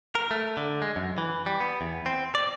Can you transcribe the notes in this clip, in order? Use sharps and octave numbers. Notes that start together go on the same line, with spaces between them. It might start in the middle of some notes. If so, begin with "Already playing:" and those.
A#4
A3
D3
G#3
F#2
E3
G3
B3
E2
C4
D5